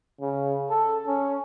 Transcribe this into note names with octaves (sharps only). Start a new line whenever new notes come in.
C#3
A4
C#4